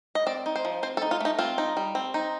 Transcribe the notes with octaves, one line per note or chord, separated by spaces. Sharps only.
D#5
C4 D5
D#4
C5
F3
C4 C5
A4
D#4
F4
A3 D#4
C4 F4
D#4
G3
C4
D#4